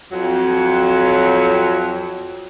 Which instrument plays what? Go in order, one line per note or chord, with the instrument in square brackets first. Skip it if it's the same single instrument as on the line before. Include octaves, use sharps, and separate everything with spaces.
[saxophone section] F2 F#3